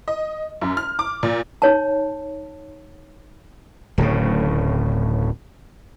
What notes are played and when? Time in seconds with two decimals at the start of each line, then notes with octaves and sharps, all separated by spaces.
0.08 D#5
0.61 F#2
0.77 F6
0.99 D6
1.23 A#2
1.62 D#4 C#5 A5
3.98 D1 A2 C#3